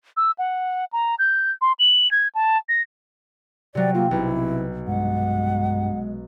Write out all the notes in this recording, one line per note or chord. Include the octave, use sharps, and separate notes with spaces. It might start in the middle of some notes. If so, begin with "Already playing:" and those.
E6
F#5
A#5
G6
C6
F#7
G#6
A5
A#6
C3 F#3 D5
A#3 C4 F4
B1 C3 E4
G2 G#3 F#5